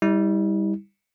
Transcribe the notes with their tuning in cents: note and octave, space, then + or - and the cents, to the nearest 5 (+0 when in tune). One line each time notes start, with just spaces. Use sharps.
G3 +15 E4 -40